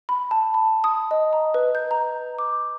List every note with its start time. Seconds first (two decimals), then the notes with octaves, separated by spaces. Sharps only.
0.09 B5
0.31 A5
0.54 B5
0.84 D#6
1.11 D#5
1.33 A#5
1.54 B4
1.75 G6
1.91 A#5
2.39 D6